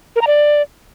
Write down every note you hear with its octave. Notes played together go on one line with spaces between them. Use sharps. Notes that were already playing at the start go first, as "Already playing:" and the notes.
A#4
A#5
D5